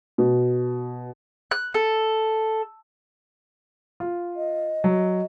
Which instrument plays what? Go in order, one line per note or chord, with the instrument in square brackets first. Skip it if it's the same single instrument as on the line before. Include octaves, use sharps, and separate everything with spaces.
[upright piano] B2
[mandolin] F#6
A4
[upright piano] F4
[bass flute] D#5
[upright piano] F#3